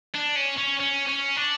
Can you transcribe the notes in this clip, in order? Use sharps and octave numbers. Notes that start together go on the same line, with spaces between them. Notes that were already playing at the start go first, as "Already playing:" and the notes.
D4
C#4
C#4
C#4
C#4
D4